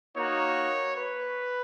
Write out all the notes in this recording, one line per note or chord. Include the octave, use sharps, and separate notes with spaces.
A#3 D#4 F#4 C#5
B4